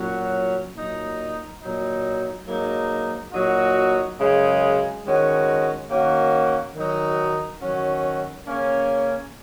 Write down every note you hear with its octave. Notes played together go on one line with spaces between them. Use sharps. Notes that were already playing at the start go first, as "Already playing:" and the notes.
Already playing: A#2 F#3 C#4 F#4
A#2 F#3 D#4
A#2 F#3 D#4
G#2 F#3 A#3 D#4
A#2 F#3 D#4 F#4
F#2 C#3 G#3
D#3 G#3 C#4 F#4
D#3 A#3 C#4 F#4
D#3 F#3 D#4 F#4
D#3 F#3 C#4 F#4
C#3 A#3 C#4